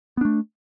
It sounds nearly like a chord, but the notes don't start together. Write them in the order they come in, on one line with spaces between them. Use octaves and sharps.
B3 D4 A3